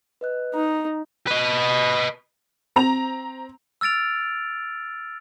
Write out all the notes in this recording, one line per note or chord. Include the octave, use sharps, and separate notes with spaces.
B4 D#5 F#6
D#4 A#5
B4 D#5
C4 A#5 F7
E6 F6 A6 D7 F7